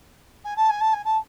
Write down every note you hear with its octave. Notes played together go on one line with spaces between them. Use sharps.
G#5
A5
G#5
A5
G#5
A5